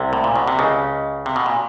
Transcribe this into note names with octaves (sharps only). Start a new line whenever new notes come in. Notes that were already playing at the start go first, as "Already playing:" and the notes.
Already playing: C2 C3
A2
A#2
B2
C3
C#2 C#3
C3
B2
A#2